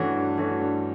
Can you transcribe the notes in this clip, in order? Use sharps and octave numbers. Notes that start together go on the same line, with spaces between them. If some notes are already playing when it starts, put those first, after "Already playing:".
Already playing: G2 E3 A3 C#4 F#4
G2
E3 A3 C#4 F#4
G2